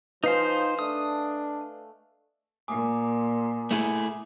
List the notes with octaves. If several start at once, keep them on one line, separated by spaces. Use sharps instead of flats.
F3 D#4 B4 C5 D#5 F5 G#5 C7
A3 D4 D#6
A#2 G#5 D6 D#6
A3 E4 G#4